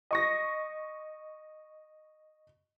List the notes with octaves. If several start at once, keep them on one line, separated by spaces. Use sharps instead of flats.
D#5 C#6 A#6